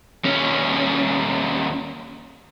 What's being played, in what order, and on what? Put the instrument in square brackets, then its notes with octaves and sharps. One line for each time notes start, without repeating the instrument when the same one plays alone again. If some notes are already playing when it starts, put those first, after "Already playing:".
[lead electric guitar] D#2 C#4